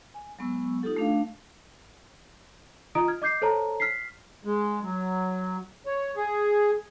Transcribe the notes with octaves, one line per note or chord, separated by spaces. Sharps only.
G#5
F#3 G#3 B3 C#6 E6
D#4 F4 G4 A4 F#5
A3 D4 F5
F4 D#5 A#5 D#6 D7
F6 G#6
D#5 D6 G6 C7
A4 C5 C#5 A5 A#5
F6 B6 C7
G#3
F#3
C#5
G#4